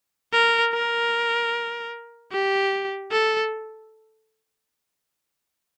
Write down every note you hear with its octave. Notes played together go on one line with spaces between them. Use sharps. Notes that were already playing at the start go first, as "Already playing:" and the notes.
A#4
A#4
G4
A4